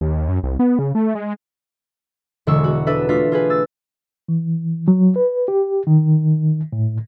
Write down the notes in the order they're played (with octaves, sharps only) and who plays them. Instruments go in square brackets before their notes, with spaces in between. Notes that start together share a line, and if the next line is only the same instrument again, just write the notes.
[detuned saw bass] D#2
F#2
C2
B3
C#3
A3
G#3
[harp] E1 D3 G#3 C#6 E6
F#4
D4 A4 B4 E5
A3 D4 F4 B6
F4 G#4 B4
E6 A6
[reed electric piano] E3
F#3
B4
G4
D#3
A2